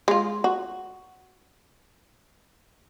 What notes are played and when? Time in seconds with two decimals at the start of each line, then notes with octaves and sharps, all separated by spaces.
0.08 G#3 F4
0.44 F#4